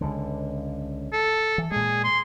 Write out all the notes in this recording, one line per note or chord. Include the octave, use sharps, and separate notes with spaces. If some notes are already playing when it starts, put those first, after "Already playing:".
C#2 D3
A4
E3
A#2 G#3 G#4
C6